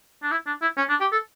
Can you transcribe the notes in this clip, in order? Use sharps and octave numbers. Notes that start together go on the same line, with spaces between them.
D4
E4
D4
E4
C#4
D4
G4
A4